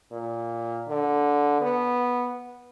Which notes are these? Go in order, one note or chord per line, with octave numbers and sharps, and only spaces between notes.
A#2
D3
B3